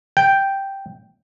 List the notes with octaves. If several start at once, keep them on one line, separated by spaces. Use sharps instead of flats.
G5